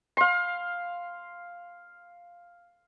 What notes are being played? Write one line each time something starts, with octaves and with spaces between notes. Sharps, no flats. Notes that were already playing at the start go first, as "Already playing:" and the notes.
F5 C6